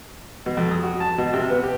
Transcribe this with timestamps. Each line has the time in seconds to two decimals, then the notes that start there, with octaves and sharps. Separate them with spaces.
0.46 B2
0.57 F2
0.71 D#6
0.83 F#4
1.00 A5
1.18 B2
1.34 C3
1.50 B3
1.63 G4